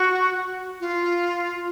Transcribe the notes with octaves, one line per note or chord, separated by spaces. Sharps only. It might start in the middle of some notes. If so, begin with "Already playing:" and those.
Already playing: F#4
F4